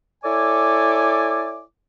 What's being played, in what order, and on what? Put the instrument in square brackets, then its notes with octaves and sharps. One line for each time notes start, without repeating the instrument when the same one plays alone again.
[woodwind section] E4 A4 C#5 D5 G#5 D6